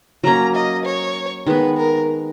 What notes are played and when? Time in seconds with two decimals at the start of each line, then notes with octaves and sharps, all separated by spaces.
0.24 F#3 A#3 C#4 A#5
0.55 D#5
0.85 C#5
1.47 D#3 G#3 B3 B4
1.77 A#4